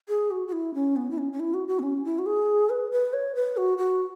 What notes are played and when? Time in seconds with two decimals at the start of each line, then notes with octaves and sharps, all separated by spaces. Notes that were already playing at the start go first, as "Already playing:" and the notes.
0.09 G#4
0.31 F#4
0.48 F#4
0.52 E4
0.74 C#4
0.96 B3
1.11 E4
1.18 C#4
1.33 C#4
1.40 E4
1.54 F#4
1.68 F#4
1.79 B3
1.83 C#4
2.05 E4
2.19 F#4
2.26 G#4
2.70 B4
2.92 B4
3.13 C#5
3.35 B4
3.57 F#4
3.78 F#4